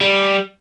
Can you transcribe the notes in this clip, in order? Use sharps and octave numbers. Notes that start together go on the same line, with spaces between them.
G3